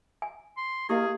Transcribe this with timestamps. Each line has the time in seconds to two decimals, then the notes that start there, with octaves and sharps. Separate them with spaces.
0.22 G#5
0.57 C6
0.89 A#3 E4 G4 G#4 D#5